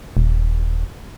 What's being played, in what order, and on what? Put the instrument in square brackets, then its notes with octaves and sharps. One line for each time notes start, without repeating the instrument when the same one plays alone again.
[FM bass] D#1